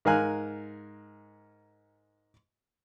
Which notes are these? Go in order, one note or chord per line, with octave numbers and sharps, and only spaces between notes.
G#2 A#4 F5 G#5 F#6